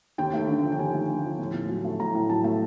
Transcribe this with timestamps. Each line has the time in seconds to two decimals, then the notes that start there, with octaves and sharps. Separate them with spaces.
0.18 D#2 G5
0.34 A3
0.48 D3
0.64 F3
0.72 G5
0.79 D#2 G#5
0.94 A3
1.09 D3
1.24 F3
1.39 A2
1.54 A2
1.69 F#3
1.85 A3
1.99 A2 A#5
2.15 A2
2.29 F#3 A5
2.44 A3